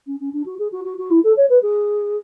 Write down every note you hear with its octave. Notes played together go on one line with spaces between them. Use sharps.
C#4
C#4
D4
F#4
G#4
F#4
F#4
F#4
E4
A4
C#5
B4
G#4